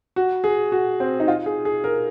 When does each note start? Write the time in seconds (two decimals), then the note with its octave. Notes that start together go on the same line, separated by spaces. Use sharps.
0.16 F#4
0.44 G#4
0.72 F#4
1.00 C4
1.20 D#4
1.28 F4
1.46 G#4
1.65 G#4
1.84 A#4